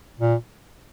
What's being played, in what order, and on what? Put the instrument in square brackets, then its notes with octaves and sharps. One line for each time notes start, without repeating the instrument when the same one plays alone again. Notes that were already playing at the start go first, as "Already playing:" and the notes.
[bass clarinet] A#2